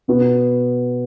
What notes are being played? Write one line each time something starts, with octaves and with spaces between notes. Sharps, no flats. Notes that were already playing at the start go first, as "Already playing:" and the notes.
B2 B3 F#4